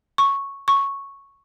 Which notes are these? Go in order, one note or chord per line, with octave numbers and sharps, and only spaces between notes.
C#6
C#6